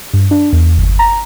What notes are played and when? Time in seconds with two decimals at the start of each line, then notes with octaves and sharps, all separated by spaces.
0.14 G2
0.31 D4
0.53 E2
0.78 G1
0.99 A#5